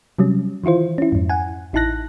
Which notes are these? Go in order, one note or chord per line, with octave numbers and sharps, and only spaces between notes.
C3 F#3 G3 C#4
D#3 E3 E4 F4 C5
C#4 E4
F2 G#2
F#5 G#5
A1 D#4 E4 A5 F#6 A#6